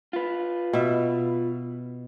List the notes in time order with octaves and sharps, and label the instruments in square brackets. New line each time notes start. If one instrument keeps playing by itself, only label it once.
[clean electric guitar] F4 B4
[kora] B2 E5